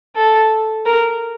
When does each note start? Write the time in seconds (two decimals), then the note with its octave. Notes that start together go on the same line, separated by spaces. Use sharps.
0.16 A4
0.86 A#4